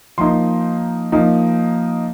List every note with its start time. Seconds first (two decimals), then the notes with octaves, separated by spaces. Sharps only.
0.18 F3 A#3 D#4 C6
1.12 F3 A#3 D#4